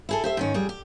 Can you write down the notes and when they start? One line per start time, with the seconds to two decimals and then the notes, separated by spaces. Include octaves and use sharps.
0.09 E4 G#4 A4
0.24 G4 C5 E5
0.37 G#2 D#3 C#4
0.54 F2 G3 G#4
0.69 G4